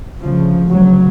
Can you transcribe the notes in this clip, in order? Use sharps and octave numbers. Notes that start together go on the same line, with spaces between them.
D2 C#3 F3
D2 C#3 F#3